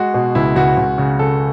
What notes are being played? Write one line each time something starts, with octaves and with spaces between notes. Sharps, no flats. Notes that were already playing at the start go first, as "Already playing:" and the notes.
Already playing: G#3 F#4
B2
C#2 E4
C#2 F#4
C#2
C#3
C#3 A4